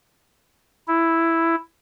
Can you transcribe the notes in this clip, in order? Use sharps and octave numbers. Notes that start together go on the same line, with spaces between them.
E4